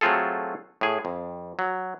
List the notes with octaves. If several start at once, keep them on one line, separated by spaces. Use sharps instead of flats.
F#3 A3 C4 F4 G#4 A4
A2 G#4
F2
F#3